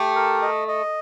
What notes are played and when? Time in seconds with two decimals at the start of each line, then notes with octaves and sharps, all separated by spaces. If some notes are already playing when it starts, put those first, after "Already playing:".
Already playing: A3 G4
0.16 A#4
0.42 D#5
0.68 D#5